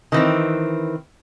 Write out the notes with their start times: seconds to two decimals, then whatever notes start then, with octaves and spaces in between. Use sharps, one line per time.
0.12 D#3 E3 C4